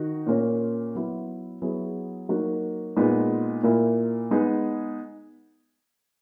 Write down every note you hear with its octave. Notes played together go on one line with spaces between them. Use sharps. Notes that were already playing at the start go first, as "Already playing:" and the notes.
Already playing: D#3 D#4 F#4
A#2 A#3 C#4
F#3 B3 E4
F#3 B3 E4 G#4
F#3 A#3 D#4 F#4
A#2 G#3 B3 D#4
A#2 A#3 E4
G#3 B3 D#4 G#4